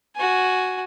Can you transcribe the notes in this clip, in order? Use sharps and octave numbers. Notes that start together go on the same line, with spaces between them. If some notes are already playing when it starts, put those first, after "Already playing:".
F#4 G#5